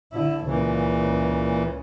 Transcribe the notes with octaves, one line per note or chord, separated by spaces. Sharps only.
D3 E4
C#2 A#2 C#3 E3